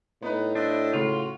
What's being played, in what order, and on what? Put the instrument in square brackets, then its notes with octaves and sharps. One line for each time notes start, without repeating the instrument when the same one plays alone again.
[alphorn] A2 [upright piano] B3 B4 [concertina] D#4
[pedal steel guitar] D4 [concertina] C5 D#5 E5
[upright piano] C#3 A3 [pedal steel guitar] F4 [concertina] F#4